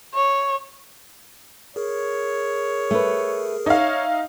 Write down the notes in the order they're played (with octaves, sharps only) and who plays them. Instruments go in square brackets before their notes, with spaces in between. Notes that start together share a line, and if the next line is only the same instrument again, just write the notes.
[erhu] C#5
[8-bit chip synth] G#4 A#4 [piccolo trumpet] C#5
[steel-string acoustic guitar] A3 B4
[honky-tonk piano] D#4 F5 [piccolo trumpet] C#5 [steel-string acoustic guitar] E5